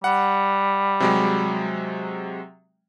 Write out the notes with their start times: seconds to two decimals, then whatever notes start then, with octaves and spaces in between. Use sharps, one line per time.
0.04 G3 F#5
1.00 C3 F#3 G#3